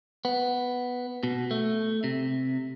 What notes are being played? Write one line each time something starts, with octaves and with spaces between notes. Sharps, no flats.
B3
B2
A3
C3